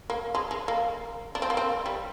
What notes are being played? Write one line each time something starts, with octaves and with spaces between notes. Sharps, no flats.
A#3
G#3
G#3
A#3
D4
C4
A#3
C4
G3